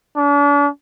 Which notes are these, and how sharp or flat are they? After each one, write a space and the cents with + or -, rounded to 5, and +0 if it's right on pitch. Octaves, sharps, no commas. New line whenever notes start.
D4 -40